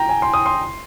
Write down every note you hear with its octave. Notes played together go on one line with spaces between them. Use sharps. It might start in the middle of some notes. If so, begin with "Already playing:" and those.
Already playing: G5 A#5
G#5
C6
D#6
C6